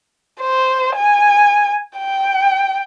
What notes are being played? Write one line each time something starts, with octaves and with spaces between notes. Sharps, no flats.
C5
G#5
G5